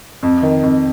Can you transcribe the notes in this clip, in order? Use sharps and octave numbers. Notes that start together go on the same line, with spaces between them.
F2
D#3
F2